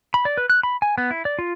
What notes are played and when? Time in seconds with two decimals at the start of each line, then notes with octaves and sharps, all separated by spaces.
0.14 B5
0.25 D5
0.38 B4
0.50 F#6
0.63 B5
0.82 G#5
0.98 B3
1.11 E4
1.25 D5
1.39 F4